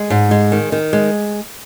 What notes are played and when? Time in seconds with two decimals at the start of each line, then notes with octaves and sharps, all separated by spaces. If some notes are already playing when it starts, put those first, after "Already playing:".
Already playing: G#3
0.10 G#2
0.31 G#3
0.52 D#3
0.72 D#3
0.93 G#3